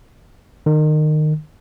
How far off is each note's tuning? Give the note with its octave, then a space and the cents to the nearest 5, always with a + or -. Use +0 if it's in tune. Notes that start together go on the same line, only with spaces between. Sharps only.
D#3 -25